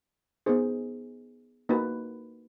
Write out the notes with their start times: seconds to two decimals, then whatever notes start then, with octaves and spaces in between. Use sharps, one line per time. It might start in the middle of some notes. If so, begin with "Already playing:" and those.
0.46 B3 D#4 G#4 C5
1.69 A#3 D#4 F#4 B4